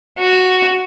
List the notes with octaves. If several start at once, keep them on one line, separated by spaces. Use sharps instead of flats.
F#4